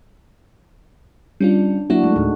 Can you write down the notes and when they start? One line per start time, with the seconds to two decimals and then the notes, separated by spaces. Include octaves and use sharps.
1.41 G3 C#4 D4 F4
1.90 F#3 A#3 D4 E4 F#4
2.04 G#3 A3
2.16 D2 A2 D#4